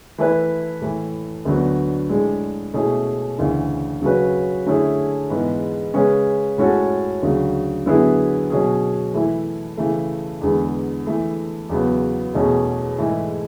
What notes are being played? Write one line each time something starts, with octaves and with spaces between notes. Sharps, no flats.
E3 A3 E4 B4
A2 E3 A3
D2 D3 F#3 B3
A2 G#3 D4
B2 A3 C#4 E4 G#4
D2 C#3 E3
C#3 F#3 C#4 F#4 B4
D3 A3 C#4 E4 G#4
G#2 E3 B3
C#3 G#3 C#4 G#4 B4
A2 G#3 C#4 F#4 A4
D2 C#3 F#3
D3 F#3 B3 E4 G#4
B2 F#3 C#4 G#4
E3 A3 E4
C#3 E3 A3
E2 D3 G#3 B3
E3 A3 E4
E2 C#3 F#3 B3
E2 B2 A3 C#4 G#4
G#2 E3 A3 E4